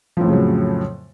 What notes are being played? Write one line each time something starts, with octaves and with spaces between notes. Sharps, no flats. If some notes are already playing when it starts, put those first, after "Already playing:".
F2 A2 C#3 F3 F#3